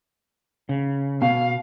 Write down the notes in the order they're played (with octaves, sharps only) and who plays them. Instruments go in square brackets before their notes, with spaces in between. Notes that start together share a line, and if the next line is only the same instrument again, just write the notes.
[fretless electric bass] C#3
[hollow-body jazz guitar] B2 [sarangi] F5